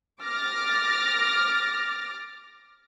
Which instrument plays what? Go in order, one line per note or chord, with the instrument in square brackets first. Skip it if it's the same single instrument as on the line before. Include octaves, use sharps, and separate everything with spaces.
[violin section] D6 F6 A6 A#6